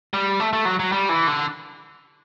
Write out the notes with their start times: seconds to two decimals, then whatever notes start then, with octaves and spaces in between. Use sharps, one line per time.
0.14 G3
0.40 A3
0.53 A3
0.65 F#3
0.79 F#3
0.92 G3
1.09 E3
1.27 D3